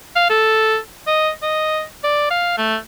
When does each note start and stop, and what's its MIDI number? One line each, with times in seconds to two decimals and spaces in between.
0.16 0.26 77
0.30 0.77 69
1.07 1.30 75
1.42 1.83 75
2.04 2.28 74
2.30 2.55 77
2.58 2.76 57